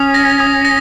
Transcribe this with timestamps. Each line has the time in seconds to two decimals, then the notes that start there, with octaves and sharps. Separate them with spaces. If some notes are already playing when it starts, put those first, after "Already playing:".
Already playing: C#4 D#6
0.14 A#6
0.40 D#6
0.65 A#6